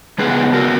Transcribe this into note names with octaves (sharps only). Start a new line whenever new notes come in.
C#3 G#3 B3 G#4 B4
F#4 A#4